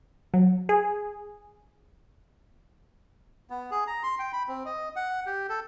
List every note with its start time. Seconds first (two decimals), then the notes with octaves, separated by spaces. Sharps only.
0.34 F#3
0.69 G#4
3.50 B3
3.71 G#4
3.87 A#5
4.03 C6
4.19 G5
4.33 B5
4.48 C4
4.65 D#5
4.96 F#5
5.26 G4
5.49 A4